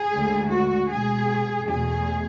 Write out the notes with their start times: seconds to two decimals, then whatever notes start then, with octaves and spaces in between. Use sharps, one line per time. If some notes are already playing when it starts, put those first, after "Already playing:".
Already playing: G#4
0.12 D2 D3 G#3
0.51 F#4
0.90 B2 G#3 G#4
1.68 E2 B2 A3 G#4